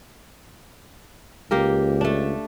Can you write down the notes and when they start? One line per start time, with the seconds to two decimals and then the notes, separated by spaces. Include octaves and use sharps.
1.51 C#2 A#3 G4 A#4
2.01 A3 D4